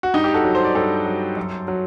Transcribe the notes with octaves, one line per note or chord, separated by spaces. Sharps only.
F#4
G2 D#4 G4
G4
F#4 A4
F#3
C5
D5
G2 A4 C5
F#3
F#2
F#3